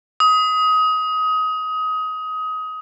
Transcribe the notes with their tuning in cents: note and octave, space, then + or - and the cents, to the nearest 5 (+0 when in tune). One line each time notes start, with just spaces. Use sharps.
D#6 +20